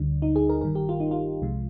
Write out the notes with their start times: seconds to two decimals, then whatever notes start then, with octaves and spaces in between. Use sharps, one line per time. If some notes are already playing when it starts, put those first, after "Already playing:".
Already playing: D2 D3 G3 D4
0.22 D#4
0.36 G#4
0.49 A#4
0.61 G1 G2 D#3 G3 A#4
0.75 G4
0.89 F4
1.00 D#4
1.11 F4
1.41 C2 C3 F3 G#3